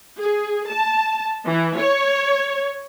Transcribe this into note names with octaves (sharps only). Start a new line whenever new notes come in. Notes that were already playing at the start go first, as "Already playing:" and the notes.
G#4
A5
E3
C#5